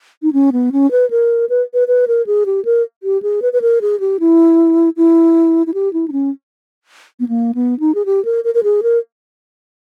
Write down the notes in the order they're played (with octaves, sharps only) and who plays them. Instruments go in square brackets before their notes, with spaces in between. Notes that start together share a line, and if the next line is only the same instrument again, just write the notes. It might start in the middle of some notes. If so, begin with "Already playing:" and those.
[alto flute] D#4
C#4
B3
C#4
B4
A#4
B4
B4
B4
A#4
G#4
G4
A#4
G4
G#4
B4
B4
A#4
G#4
G4
E4
E4
E4
G4
E4
D#4
C#4
B3
A#3
B3
D#4
G#4
G4
A#4
A#4
A#4
G#4
A#4